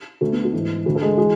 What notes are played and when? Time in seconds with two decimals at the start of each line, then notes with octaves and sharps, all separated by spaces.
0.21 D2 D3 A3
0.33 B3
0.45 A3
0.53 G#2 E3
0.86 D2 D3 A3
0.95 A4
1.02 G#3 G#4
1.18 E3 G#3 G#4